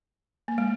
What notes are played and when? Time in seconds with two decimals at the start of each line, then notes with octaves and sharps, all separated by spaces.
0.48 A#3
0.58 G#3